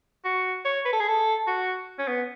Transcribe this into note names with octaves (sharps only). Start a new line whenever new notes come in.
F#4
C#5
B4
A4
G#4
A4
F#4
C#4
B3